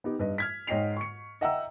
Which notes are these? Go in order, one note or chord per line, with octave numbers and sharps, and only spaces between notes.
B3 D#4 G4
G2 B4 D#5
F6 G#6 B6
G#2 C#5 D#5 G5 C7 F7
C#6 C#7
D#5 E5 F#5 G5 A#5 E6